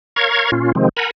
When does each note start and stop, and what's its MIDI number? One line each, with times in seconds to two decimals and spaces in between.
0.16 0.51 70
0.16 0.51 73
0.16 0.51 77
0.16 0.51 82
0.16 0.51 85
0.16 0.51 92
0.52 0.72 46
0.52 0.72 61
0.52 0.72 65
0.75 0.89 48
0.75 0.89 51
0.75 0.89 53
0.75 0.89 56
0.75 0.89 60
0.97 1.11 70
0.97 1.11 78
0.97 1.11 80
0.97 1.11 82
0.97 1.11 83